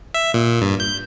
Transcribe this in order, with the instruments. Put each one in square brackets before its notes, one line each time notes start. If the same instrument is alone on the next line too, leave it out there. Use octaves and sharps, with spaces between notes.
[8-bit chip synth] E5
A#2
G2
G6